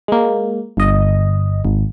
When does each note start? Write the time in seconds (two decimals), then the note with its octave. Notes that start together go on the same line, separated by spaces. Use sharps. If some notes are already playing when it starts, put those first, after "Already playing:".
0.08 G#3 A#3
0.77 G1 D#5
1.65 G#1